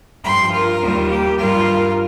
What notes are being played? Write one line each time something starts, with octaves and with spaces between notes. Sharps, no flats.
G2 F3 G5 C6
F4 A#4
D#2 D#3 G3
G4
G2 G3 F4 A#4